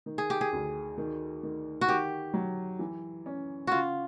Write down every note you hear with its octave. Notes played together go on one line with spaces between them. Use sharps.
D#3
G#4
G4
G#4
D2
D#3
D#3
F#4
D#3 G4
F#3
E3
C#4
C#3 F4 F#4